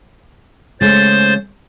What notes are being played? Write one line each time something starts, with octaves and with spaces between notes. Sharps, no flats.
C#3 G#3 A3 C5 A6